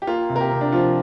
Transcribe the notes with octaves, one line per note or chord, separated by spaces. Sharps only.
G4
A#3 F4
C3
A#4
G4
C3
D4
F3 F4